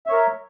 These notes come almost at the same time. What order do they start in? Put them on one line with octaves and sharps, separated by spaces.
E5 C#5 A#4